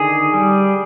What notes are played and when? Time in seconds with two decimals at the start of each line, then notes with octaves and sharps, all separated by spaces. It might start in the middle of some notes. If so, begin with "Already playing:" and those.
Already playing: D3 D#3 G#4
0.33 G3